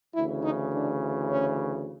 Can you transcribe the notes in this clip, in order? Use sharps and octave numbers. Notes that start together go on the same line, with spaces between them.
D2 C#3 E3 E4
D#4
D4
C#4